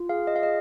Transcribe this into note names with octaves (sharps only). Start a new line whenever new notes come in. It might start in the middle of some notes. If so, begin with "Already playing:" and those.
Already playing: F4
G#4 F5
D#5
F5
G#4 D#5